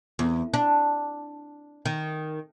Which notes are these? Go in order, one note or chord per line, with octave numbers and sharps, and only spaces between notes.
E2
D4
D#3